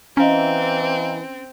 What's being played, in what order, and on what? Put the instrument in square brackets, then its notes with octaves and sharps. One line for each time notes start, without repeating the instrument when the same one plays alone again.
[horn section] E3 [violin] C4 [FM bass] C#4 [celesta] D#5 F5 A#5